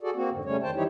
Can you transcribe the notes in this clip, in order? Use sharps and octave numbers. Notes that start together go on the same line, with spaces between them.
F#4 G#4 A4 D5
A#3 C4 F#4
F2 G#2 D3
C#3 G3 A3 C#4 C#5
F2 D#3 C5 G5 A5
E3 G3 D#4 E4 G4 C#5